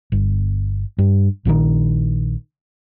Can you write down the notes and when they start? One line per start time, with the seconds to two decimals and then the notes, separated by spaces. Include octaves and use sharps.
0.12 G1
0.98 G2
1.45 A#1 A#2 D3 D#3